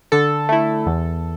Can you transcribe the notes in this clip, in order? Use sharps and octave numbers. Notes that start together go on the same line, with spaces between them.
D3 A4
A3 E4
E2